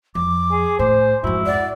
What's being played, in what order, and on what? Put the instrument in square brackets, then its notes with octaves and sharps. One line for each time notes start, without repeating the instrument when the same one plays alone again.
[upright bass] F2 [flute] D6
[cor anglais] G#4
[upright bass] A2 [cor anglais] C5 [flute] G#5
[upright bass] F2 G#2 [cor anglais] E4 [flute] F#4
[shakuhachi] D5 [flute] F#5